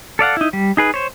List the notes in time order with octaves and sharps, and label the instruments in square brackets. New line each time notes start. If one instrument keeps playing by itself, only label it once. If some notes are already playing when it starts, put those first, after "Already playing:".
[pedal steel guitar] A4 D5 F5 F#5
D#4 E4
G3
D#4 G#4 B4
C5 C#5